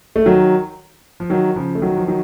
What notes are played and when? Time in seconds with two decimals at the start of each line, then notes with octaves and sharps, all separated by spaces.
0.16 A3
0.26 D#3 F#3
1.20 F3
1.30 D#3 F#3
1.56 C#3 F3
1.75 A3
1.82 D#3 F#3
1.97 F3
2.08 D#3 F#3